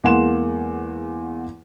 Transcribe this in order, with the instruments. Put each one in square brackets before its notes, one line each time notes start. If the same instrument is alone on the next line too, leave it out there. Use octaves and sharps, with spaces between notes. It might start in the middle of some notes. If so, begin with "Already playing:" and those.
[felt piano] E2 G#3 A#3 F#5 C6 E7